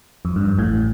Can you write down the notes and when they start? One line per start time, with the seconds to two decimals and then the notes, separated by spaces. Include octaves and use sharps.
0.25 F2
0.36 G2
0.58 A1 A2